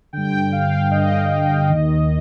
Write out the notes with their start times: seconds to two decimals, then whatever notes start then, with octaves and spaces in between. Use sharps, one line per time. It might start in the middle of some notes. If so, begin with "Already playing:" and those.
0.13 G2 D3 G5
0.52 F5
0.91 G2 D3 D#5
1.70 D#2 D#3